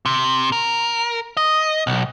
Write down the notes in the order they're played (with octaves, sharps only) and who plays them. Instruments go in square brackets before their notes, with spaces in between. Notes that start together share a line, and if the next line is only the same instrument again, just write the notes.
[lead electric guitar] C3
A#4
D#5
B1